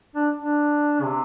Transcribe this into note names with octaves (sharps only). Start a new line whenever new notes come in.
D4
D4
C3